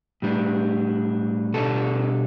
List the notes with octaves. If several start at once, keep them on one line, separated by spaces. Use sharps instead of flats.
A2 G3 D4
B2 G3 D4 A4